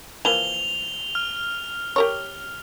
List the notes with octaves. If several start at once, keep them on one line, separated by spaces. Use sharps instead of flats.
E3 F3 A#3 F7 G7
F6
G4 A#4 C#5